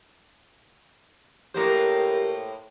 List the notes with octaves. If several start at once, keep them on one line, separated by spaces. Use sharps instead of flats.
A2 A#3 G4 A#4 C5